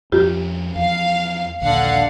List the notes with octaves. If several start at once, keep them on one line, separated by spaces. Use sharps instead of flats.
F2 F3 C#4 F4 G4
E2 F3 F5
A#1 D#2 D3 F5 F#5